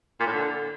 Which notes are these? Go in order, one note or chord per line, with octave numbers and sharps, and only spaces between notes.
A#2
A2
D3